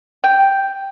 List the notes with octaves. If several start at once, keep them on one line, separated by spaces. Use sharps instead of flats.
G5